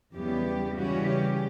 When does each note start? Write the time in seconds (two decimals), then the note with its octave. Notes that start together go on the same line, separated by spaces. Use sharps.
0.15 E2 C#3 E3 G3 B3 G4
0.77 C#3 E3 G3 C#4 F#4
1.08 G4